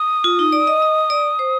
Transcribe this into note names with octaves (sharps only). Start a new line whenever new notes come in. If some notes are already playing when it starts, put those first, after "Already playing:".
Already playing: D#6
F4
D#4
D5
D#5
D#5
D5
C5